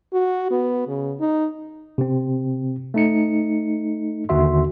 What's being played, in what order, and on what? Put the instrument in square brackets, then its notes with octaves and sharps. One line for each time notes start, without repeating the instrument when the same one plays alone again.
[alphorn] F#4
B3
C#3
D#4
[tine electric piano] C3 C4
A3 D#4 C#7
D#2 D3 D#3 F#4 E5 C6